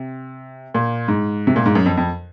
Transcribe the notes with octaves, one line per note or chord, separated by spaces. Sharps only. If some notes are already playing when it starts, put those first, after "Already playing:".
Already playing: C3
A#2
G#2
C3
A#2
G#2
F#2
F2
F2